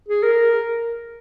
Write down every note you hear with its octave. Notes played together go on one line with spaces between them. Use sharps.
G#4
A#4